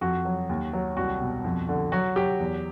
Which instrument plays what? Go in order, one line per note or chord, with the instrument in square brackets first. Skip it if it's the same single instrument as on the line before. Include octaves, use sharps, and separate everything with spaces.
[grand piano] F2 F#4
F#3
D#2
F#3
C2 F#4
B2
F2
D3
F#3 F#4
F#3 G4
E2